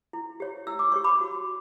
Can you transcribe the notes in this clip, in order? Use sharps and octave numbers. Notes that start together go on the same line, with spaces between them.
E4
G4 C#5
E4 E6
D6
G4 C#5 C#6
B5 D6
F#4